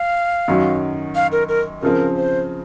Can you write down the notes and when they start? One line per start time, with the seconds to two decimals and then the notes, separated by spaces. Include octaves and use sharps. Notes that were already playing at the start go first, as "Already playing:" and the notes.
Already playing: F5
0.48 F#2 D#3 F#3 C#4
1.15 F5
1.32 A#4
1.48 A#4
1.82 C#3 F3 C4 A#4
2.16 C5